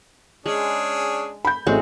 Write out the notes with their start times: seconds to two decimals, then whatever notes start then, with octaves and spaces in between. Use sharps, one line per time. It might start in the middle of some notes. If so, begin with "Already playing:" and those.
0.46 G#3 C#4 D4 G#4
1.45 B5 G6
1.66 A1 G#3 A3 C4 F#4